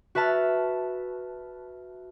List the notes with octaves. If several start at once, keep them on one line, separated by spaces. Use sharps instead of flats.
F#4 B4 E5 A5 F6